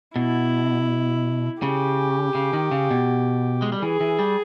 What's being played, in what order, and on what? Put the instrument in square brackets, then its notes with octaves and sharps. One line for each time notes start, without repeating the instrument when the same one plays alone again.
[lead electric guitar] B2 [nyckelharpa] E4
[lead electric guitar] C#3 [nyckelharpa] G4
[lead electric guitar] C#3
D#3
C#3
B2
G#3
G3
[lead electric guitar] E3 [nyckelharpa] G#4
[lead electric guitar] E3
G3